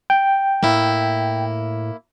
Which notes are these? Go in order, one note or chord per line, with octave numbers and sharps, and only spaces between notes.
G5
A2 A#3 E4